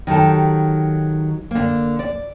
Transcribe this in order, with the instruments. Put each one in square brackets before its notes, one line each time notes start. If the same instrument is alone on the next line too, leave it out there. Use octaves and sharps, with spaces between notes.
[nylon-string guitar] D#3 F#3 G4 A4
D3 A#3
D5